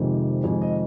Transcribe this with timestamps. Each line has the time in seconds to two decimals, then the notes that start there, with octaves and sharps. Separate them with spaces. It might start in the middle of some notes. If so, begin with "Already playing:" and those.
Already playing: F2 C3 D#3 G#3 G4
0.44 F2 C3 D#3 G#3 G#4
0.61 D#5